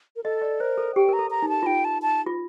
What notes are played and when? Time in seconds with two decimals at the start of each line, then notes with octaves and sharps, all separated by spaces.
0.16 A#4
0.24 A4 D#5
0.42 D5
0.60 A#4 C5
0.78 A4
0.95 G4 G5
1.09 A#4 A#5
1.19 A4
1.31 A#5
1.42 D#4
1.49 A5
1.63 F4
1.66 D#4 G5
1.85 A5
2.02 A5
2.26 F4